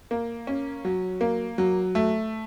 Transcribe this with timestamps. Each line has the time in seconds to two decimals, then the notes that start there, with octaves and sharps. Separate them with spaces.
0.11 A#3
0.47 C#4
0.85 F#3
1.21 A#3
1.58 F#3
1.95 A3